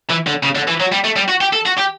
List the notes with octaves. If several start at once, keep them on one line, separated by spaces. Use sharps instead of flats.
E3
D3
C#3
D3
E3
F#3
G3
A3
G3
F#4
G4
A4
F#4
G4